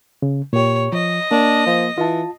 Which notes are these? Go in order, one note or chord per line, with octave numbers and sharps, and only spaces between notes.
C#3
A#2 G4 C#5
F3 D#5
A#3 D4
F3
E3 F4 A5